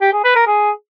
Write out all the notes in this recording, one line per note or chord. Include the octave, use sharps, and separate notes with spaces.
G4
G#4
B4
A#4
G#4